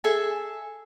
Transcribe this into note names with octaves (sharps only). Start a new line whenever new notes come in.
G#4 A4 E5 G#5